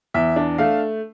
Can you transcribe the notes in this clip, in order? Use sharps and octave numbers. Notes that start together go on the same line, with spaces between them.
E2 E5
D4
A3 F5